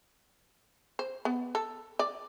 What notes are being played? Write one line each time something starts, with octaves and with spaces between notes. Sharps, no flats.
C5
B3
A4
D5